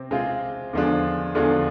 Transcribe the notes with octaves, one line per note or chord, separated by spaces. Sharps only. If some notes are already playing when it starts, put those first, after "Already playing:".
Already playing: C3 C4
C3 G#3 C4 F4
E2 D3 F3 G#3 D4
E2 D3 F3 G#3 D4